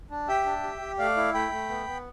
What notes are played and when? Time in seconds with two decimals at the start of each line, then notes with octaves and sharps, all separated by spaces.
0.10 D4
0.28 G4 E5 G5
0.46 D4
0.63 G4
0.81 G4
0.98 A3 D5 F5
1.17 E4
1.34 A3 G5 B5
1.52 A3
1.69 B3
1.87 B3